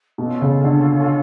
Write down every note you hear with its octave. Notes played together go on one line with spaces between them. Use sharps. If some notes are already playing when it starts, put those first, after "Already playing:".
B2 C#4 F4 A4
C#3
D3